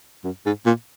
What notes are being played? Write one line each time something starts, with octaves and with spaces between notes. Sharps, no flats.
F#2
G#2
A#2